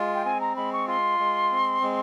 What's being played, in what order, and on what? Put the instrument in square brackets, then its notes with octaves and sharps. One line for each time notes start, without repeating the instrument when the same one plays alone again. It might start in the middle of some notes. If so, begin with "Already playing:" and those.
Already playing: [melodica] G#3 F4
[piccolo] G5
[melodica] C4 [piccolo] G#5
[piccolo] A#5
[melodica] G#3 [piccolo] B5
[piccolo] C#6
[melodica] F4 [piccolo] C6
[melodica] G#3
C4
G#3